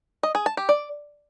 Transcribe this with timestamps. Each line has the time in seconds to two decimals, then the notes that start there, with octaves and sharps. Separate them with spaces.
0.23 D#5
0.35 G#4
0.46 A5
0.57 G4
0.69 D5